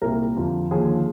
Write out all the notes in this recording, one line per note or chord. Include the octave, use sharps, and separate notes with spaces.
C2 A#2 G3 A#4
F2 D3 F3
D#2 D3 F3 G#4